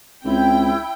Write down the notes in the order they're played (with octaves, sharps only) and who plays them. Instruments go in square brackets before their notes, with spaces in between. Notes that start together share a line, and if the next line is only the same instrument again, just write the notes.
[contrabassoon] C#2 [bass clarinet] C4 [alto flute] E4 [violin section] G5